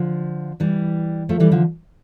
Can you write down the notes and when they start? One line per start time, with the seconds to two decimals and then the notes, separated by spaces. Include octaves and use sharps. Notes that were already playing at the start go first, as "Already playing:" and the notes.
Already playing: D3 F3
0.60 E3 G3
1.29 F3 A3
1.40 E3 G3
1.51 D3 F3